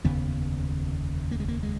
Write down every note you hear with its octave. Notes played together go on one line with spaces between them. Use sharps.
F1 D#2 C#3 B3
A#3
G#3
A#3
G#3